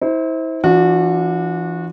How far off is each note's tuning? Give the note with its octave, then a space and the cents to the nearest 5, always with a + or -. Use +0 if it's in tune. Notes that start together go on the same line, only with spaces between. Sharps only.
E4 -35 C5 +0
E3 +40 D4 +0 F#4 -25